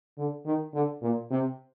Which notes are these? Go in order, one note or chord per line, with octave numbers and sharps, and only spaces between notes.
D3
D#3
D3
A#2
C3